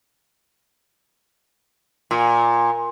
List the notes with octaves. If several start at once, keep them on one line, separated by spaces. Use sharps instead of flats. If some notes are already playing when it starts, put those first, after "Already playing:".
A#2